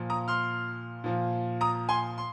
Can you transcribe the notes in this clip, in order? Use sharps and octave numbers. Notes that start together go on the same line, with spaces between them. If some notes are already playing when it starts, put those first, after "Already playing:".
Already playing: A#2 F3
A#5 D#6
C6 F6
A#2 F3
A#5 D#6
G#5 C6
C6